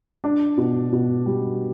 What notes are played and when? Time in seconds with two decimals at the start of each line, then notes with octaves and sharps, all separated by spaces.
0.24 D4
0.58 B2
0.92 B2
1.26 G3